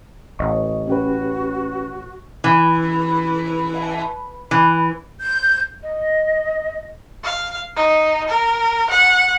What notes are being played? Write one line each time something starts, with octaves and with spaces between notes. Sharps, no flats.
A1 D#5 C#6
C#4 F#4 G4 B4
E3
E3
G6
D#5
F5
D#4
A#4
F#5